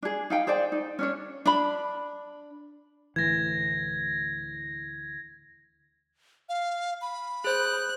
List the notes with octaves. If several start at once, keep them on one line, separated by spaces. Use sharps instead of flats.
D4 G#4
D#4 F5 G5
G#4 C5 D5 G5
D#4
C#4 D4 C#5
D4 B5
D2 A2 E3 G#6 A#6
F5
B5
G#4 C5 F#6